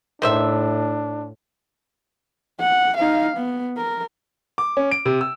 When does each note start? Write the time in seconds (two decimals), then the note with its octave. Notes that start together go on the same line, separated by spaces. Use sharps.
0.22 A2 D#3 D4 C5 E5
2.60 F#5
2.98 D#4 F5
3.38 B3
3.77 A#4
4.58 D6
4.77 C#4
4.91 D7
5.06 C3
5.21 E6